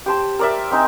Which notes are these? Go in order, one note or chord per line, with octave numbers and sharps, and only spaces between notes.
G4 C5 A5
A#4 D5 E5
C4 D#4 G#5